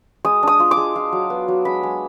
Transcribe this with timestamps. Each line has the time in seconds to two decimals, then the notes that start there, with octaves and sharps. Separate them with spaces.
0.25 G#3 D#6
0.43 D4 D#6
0.60 F4
0.71 D6
0.77 G#3
0.96 F4
1.12 F#3
1.30 B3
1.48 F#3
1.65 G#3 B5
1.83 G#3